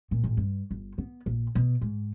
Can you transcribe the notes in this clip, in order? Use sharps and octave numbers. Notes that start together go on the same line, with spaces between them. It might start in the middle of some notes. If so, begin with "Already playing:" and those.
A#2
A1
G2
G1
B3
A#1
B2
G#2